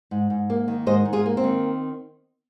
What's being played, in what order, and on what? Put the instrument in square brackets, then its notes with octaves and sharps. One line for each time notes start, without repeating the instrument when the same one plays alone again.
[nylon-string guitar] G#2
G#2
A#3
D#3
G#2 C5 D#5
G#2
F4 G#4
A#3
C4
D#3